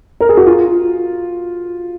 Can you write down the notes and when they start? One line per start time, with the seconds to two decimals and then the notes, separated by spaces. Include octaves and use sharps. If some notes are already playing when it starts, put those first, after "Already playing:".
0.20 A#4
0.29 G#4
0.37 F#4
0.46 F4